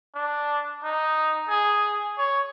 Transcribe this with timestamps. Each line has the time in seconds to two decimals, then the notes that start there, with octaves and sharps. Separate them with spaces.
0.15 D4
0.83 D#4
1.49 G#4
2.18 C#5